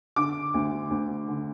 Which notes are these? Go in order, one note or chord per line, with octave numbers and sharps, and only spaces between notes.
D3 D6
D2
D2
D3